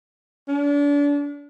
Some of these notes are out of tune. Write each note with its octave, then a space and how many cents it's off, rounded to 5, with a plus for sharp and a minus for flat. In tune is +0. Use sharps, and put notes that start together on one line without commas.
D4 -35